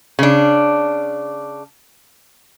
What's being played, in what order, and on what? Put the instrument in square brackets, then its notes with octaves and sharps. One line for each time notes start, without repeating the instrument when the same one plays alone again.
[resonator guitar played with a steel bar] C#3 D4